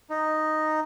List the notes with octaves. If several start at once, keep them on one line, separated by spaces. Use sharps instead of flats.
D#4